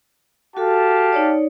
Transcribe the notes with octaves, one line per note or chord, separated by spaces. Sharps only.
F#4 G4 A4 F5 A5
D#4 C#5 D5